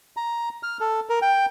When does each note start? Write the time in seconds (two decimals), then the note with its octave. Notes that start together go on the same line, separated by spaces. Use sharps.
0.17 A#5
0.63 F6
0.80 A4
1.09 A#4
1.22 G5